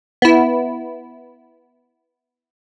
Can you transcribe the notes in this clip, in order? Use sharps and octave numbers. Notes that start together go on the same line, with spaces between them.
B3 E4